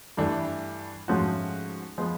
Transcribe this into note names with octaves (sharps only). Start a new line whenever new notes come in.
G2 E3 A3 D4
G#2 F3 A3 C#4 F#4
F3 G#3 B3